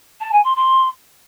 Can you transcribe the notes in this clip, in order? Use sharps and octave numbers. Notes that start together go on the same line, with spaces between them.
A5
G#5
C6
C6